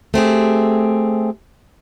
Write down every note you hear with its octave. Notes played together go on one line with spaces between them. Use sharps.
A3 C4 G4 G#4